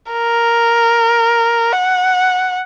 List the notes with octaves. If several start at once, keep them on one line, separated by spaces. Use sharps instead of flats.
A#4
F#5